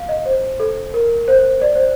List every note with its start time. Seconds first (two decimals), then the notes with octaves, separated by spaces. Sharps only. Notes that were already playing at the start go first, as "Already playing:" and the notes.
Already playing: F5
0.09 D#5
0.26 C5
0.60 A4
0.94 A#4
1.28 C5
1.61 D5
1.75 C5